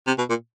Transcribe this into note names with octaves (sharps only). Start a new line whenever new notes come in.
C3
B2
A#2